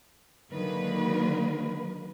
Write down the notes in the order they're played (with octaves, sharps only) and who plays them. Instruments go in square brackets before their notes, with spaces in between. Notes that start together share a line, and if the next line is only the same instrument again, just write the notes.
[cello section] D3 D#3 F#3 G#3 A#3 B4